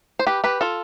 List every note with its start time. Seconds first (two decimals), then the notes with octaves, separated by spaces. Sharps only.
0.19 C5
0.27 G4 B4
0.44 G4 B4
0.61 F4 A4